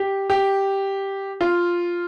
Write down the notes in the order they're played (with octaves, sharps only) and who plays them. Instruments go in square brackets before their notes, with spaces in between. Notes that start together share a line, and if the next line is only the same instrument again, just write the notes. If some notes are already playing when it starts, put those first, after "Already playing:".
Already playing: [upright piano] G4
G4
F4